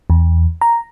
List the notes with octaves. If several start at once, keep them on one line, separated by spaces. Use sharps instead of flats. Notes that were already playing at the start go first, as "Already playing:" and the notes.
E2
A#5